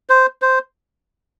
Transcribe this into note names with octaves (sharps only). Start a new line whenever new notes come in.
C5
C5